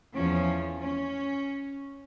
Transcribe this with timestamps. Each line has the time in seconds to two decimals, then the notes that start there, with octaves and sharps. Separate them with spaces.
0.14 E2 F3 C#4
0.79 C#4